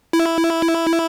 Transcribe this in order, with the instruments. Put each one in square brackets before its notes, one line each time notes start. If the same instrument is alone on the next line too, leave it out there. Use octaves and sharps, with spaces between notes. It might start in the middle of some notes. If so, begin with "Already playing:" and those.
[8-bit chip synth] E4